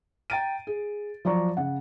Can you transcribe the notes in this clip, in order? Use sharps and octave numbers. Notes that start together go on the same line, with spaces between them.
G5 A#5 A6 D7 D#7
G#4
F3 F#3 D5 A#5 C#6
C#3 F#5